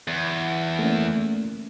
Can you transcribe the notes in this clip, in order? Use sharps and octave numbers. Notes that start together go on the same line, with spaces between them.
E2
A3 A#3 C#4